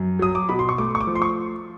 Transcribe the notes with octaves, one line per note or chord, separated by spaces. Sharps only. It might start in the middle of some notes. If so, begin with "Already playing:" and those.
Already playing: F#2
F#3 D#6
D6
B2 B5
C6
C#6
A3 D6
C#6
D6
F3
C6
C#6